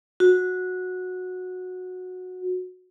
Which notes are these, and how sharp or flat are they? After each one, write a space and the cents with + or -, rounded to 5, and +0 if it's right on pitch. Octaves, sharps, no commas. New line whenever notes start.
F#4 -15